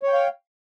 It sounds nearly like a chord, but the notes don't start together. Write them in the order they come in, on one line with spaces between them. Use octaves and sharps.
C#5 G5 F5